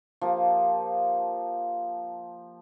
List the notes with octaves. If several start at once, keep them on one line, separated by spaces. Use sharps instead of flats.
F3 A#3 G4